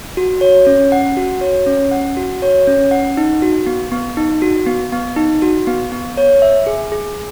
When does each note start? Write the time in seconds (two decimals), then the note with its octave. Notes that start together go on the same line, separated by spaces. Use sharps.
0.17 F#4
0.41 C#5
0.67 C#4
0.92 F#5
1.17 F#4
1.41 C#5
1.67 C#4
1.91 F#5
2.17 F#4
2.42 C#5
2.67 C#4
2.91 F#5
3.17 D#4
3.42 F#4
3.66 B3
3.92 B3
4.17 D#4
4.42 F#4
4.66 B3
4.92 B3
5.17 D#4
5.42 F#4
5.67 B3
5.92 B3
6.17 C#5
6.42 E5
6.67 G#4
6.92 G#4